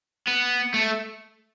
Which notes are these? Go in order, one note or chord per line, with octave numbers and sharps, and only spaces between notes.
B3
A3